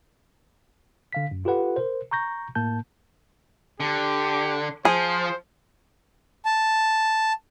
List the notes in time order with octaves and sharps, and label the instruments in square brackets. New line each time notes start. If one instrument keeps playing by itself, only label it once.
[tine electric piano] D3 F5 B6
F#2
F4 G4 A4 B4 F#5
A#4 C5
A#5 C#6 G6 A#6
A2 A#3 A5 G6
[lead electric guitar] D3 [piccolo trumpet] G4
[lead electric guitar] F3 [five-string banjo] G#4 [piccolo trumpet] C5
[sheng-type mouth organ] A5